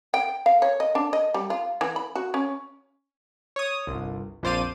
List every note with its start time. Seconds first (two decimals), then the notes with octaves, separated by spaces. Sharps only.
0.14 G5
0.46 F5
0.62 C#5
0.80 D#5
0.95 D4
1.13 D#5
1.34 G3
1.50 F4
1.81 E3
1.96 B5
2.15 F#4
2.34 C#4
3.56 C#5 D#6
3.87 G1 C2
4.43 A#1 F2 C5 D5 F5 D#7